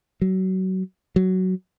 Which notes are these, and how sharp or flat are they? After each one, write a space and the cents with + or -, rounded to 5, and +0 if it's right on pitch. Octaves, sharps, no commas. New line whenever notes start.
F#3 +25
F#3 +10